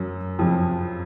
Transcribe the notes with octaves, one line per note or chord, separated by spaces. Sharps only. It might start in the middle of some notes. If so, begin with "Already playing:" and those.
Already playing: F#2 F#3
F2 F3